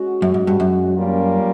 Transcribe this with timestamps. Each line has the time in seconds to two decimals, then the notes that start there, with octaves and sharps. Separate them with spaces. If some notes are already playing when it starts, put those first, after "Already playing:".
Already playing: G#3 C#4 F#4
0.22 F#2
0.34 G#2
0.47 G2
0.60 F#2
0.96 G3 A#3 C#4 F4 A#4